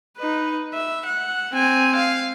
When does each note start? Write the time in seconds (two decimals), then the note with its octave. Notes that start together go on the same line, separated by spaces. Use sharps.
0.18 D#4 B4
0.74 E5
1.06 F#5
1.53 C4 G#5
1.96 F5